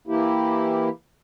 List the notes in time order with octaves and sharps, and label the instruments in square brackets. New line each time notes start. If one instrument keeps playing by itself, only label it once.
[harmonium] E3 A#3 E4 G4